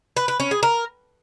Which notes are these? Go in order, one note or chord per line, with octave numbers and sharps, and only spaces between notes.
B4
B4
C#4
G#4
A#4